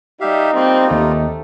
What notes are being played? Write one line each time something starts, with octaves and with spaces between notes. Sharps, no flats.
G3 D#4 G4 E5 F5
G3 A#3 C4 F4
D#2 A3